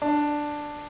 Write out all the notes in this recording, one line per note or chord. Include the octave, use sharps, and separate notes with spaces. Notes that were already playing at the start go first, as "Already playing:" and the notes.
D4